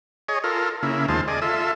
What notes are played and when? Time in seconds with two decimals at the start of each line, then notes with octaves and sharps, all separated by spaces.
0.29 G#4 C#5 D#5
0.44 F4 A4 A#4
0.83 C#3 A#3 E4
1.08 D#2 G#3 F4 C5 A5
1.28 G#4 D5 D#5
1.42 F4 A4 E5